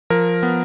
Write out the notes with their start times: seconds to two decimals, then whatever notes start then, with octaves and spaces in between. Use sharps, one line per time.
0.10 F3 A#4
0.43 B3